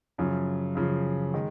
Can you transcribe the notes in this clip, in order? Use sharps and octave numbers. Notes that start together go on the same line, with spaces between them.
F#2 C#3 F3
F#2 C#3 F3
D#3 G#3